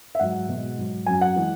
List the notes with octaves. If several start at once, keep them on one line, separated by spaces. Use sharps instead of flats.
E5
G#2 F#3 F#5
B2 G#3
G#2 F#3
F#2 F#3 G#5
F#5
E3 G#3